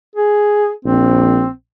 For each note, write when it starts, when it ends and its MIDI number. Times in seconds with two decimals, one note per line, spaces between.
0.16 0.70 68
0.85 1.45 34
0.85 1.50 60